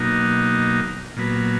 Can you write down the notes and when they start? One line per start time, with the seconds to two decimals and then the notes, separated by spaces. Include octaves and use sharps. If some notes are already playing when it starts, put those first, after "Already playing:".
Already playing: B2 F#3 A#3 D#4
1.17 A#2 F#3 B3